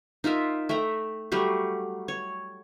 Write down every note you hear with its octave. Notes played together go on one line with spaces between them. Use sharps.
D#4 F4 A#4 E5
A3 E5 G5 A#5
F#3 G3 A3 G4
C#5